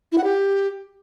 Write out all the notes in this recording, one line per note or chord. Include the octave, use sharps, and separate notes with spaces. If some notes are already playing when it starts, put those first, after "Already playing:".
E4
F#5
G4